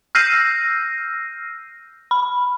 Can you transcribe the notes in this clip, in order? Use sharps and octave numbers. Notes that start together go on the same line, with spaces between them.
E6 F6 G6 A#6 C7 D#7
B5